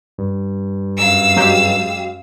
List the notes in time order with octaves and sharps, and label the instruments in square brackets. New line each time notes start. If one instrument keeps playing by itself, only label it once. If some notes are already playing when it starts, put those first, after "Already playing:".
[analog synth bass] G2
[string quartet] F#2 F5 E6
[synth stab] F#3 G#3 G4